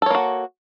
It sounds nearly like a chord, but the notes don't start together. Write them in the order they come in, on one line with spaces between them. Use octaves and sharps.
A4 C#5 A#3 F#4